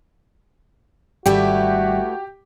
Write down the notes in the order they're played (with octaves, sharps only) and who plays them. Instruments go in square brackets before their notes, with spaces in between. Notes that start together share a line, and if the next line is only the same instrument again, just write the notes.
[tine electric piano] G#1 G3 [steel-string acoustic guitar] A3 E4 B4 [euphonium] F#4 [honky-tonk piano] G4